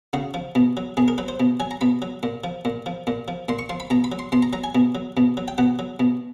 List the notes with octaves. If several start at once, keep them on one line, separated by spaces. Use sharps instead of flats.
C#3 F#4
F3
B2
F#3
B2 G#4
A#4
F#3 B4
C5
B2
F#3 G#5
A#5
B2 B5
F#3
A#2
F3
A#2
F3
A#2
F3
A#2 C6
C#6
F3 C6
B5
B2 A#5
B5
F#3
C6
B2 C6
A#5
F#3 A#5
G#5
B2
F#3
B2
F#3
G5
B2 F#5
F#3
B2